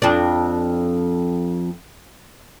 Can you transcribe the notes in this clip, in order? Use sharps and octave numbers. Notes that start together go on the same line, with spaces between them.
F2 D4